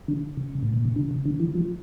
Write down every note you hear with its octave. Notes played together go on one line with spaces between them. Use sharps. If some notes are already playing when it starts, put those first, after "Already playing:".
D3
C#3
A2
A#2
C#3
D3
C#3
D3
E3
F3